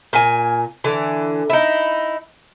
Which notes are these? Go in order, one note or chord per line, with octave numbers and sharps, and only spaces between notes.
A#2 G#5
D3 E3
D#4 E4